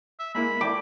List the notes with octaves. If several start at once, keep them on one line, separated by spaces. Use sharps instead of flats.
E5
G#3 A#3 E4 B5
E4 D5 G5 D6